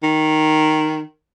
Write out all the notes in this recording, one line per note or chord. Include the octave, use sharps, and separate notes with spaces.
D#3